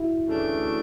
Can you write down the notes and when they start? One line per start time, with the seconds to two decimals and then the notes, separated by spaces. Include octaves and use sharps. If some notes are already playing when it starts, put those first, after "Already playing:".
Already playing: E4 F#4
0.25 D2 C#3 E3 A3 D4